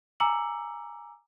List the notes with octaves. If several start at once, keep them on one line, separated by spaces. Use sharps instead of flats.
G#5 A#5 D6 E6 C#7 F#7